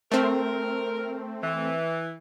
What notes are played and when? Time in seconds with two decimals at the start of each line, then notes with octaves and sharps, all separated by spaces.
0.11 A3 C4 A#4
1.43 E3